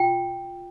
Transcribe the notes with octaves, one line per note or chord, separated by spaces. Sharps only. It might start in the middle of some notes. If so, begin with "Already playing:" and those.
Already playing: F4 G5